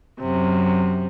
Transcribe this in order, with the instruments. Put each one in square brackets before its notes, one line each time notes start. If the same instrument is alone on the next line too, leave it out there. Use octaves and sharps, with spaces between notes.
[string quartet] F#2 C3